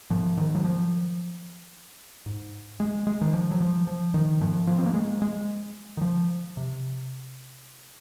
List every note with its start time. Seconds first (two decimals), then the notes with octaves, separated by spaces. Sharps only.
0.10 G#2 F3
0.37 D#3
0.55 F#3
0.64 F3
2.26 G#2
2.80 G#3
3.07 G#3
3.21 D#3
3.34 F3
3.51 F#3
3.61 F3
3.87 F3
4.14 D#3
4.41 G#2 F3
4.67 F3
4.78 C4
4.86 A#3
4.94 G#3
5.22 G#3
5.97 D#3
6.01 F3
6.57 C3